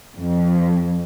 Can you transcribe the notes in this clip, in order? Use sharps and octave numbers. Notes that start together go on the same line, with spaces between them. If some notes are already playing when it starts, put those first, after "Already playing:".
F2